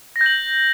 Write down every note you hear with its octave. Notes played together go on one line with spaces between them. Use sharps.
A#6
G6
F#7